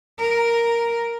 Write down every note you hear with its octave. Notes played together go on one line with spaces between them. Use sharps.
A#4